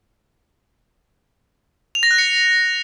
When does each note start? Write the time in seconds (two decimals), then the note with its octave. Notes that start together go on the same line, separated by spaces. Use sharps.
1.95 F7
2.03 A#6
2.11 F#6
2.18 C#7